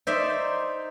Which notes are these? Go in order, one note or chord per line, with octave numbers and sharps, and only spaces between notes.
D#4 C5 D5 E5